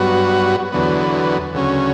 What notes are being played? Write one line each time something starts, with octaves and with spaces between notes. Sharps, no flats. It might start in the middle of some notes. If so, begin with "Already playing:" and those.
Already playing: G2 F#3 B3 F#4
E2 D3 F#3 B3
D2 C#3 F#3 C#4